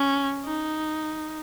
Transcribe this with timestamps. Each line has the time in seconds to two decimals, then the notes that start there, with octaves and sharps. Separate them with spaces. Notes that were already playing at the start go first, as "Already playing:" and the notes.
Already playing: C#4
0.45 D#4